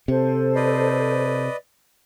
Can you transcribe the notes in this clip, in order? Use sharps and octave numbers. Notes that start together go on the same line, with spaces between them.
C3 A4 C5
B4 D5 D#5